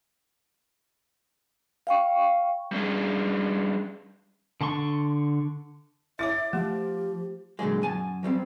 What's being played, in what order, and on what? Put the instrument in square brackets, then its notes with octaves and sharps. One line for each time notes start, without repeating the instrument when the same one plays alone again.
[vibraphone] F5 G5 C#6
[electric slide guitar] G3 C#4 D4 G#4
[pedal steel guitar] D3 A5 C6 C#6
[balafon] E4 C#5 [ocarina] E5 [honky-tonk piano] D6 A6
[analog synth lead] F3 [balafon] A3 [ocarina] G4
[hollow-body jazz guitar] A#2 D3 F#3 G#3
F#2 G#5 A5
F#3 G3 A3 C4